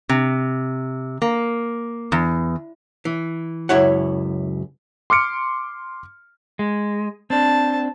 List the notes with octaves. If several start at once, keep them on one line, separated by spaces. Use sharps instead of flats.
C3
A#3
E2
E3
C#2 F#2 E4 C#5 F#5
C6 D6 F6 C#7 D7
G#3
C4 D4 A5